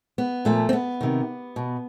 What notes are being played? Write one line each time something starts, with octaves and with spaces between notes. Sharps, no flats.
B3
A#2 F3 A3
C4
B3
C3 D#3
B2